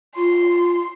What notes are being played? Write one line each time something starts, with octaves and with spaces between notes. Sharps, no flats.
F4 C6